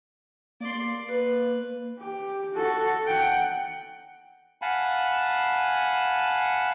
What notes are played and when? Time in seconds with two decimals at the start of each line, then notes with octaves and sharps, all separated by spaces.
0.60 A#3 D5 C6
1.08 B4
1.99 G4
2.54 F#4 A4
3.06 F#5 G5
4.62 F5 F#5 G#5 A5 B5